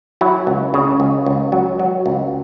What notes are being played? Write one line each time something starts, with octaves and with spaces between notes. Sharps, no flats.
F#3 E4
C#2
C#3
C#2
C#2
F#3
F#3
C#2